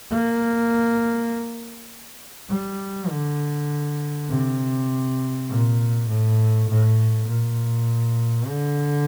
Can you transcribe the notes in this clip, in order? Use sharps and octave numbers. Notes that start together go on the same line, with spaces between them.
A#3
G3
D3
C3
A#2
A2
A2
A#2
D3